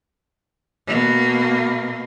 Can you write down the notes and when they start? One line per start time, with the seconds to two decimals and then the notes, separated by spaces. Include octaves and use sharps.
0.87 B2 A#3